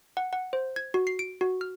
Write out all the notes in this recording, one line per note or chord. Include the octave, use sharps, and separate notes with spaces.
F#5
F#5
C5
G#6
F#4
C7
D7
F#4
F6